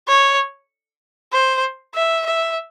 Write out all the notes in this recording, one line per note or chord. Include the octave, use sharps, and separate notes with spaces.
C#5
C5
E5
E5